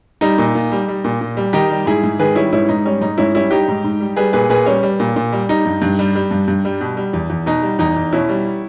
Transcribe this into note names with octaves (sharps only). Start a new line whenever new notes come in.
G3 D#4
A#2
A#2
G3
G3
A#2
A#2
G3
D#3 D#4 G4
G3
G#2 E4 G#4
G#2
D#3 G#4 B4
G3 C#4 E4
G#2 C#4 E4
G#2 D#4
G3 C#4
G#2 D#4
G#2 C#4 E4
G3 C#4 E4
G3 D#4 G4
G#2
G#2
G3
G3 G#4 B4
A#2 G#4 B4
A#2 G#4 B4
G3 C#4
G3
A#2
A#2
G3
G3 D#4
G2
G2
G3
G3
G2
G2
G3
B2
G3
E2
E2
B2 D#4
G3
E2 D#4
E2
B2 C#4 E4
G3